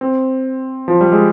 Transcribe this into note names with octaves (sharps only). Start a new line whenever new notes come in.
C4
F3
G3
G#3